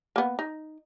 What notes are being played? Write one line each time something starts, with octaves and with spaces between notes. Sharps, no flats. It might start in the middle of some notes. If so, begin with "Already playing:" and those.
A#3 B3
D#4